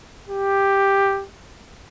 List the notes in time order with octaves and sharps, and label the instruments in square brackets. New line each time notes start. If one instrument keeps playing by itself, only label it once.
[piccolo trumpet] G4